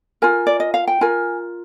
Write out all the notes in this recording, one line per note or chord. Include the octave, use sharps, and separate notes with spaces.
F4 A#4 G#5
D5
D#5
F5
G5
F4 A#4 G#5